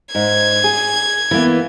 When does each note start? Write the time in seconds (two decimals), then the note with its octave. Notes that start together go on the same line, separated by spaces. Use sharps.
0.15 G#2 G#6
0.64 G#4
1.31 E3 A#3 B3